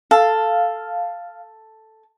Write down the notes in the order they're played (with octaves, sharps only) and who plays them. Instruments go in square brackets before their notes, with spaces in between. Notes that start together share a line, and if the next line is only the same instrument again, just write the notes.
[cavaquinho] A4 [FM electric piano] F5